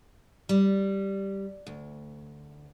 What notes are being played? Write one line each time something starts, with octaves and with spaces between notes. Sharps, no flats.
G3
D2